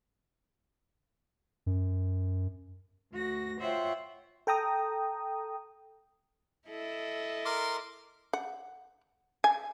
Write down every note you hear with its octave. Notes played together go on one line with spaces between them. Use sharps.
F#2
D2 F#4 A#6
F4 C5 C#5 E5 F#5 G5
A4 G5 A#5 D#6
E4 A4 D#5
A#4 C6 D6
F#5
G#5